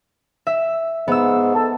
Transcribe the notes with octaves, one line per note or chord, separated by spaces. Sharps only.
E5
G#2 B3 E6
A4